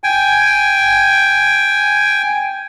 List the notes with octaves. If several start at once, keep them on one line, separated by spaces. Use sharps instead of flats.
G5 G#5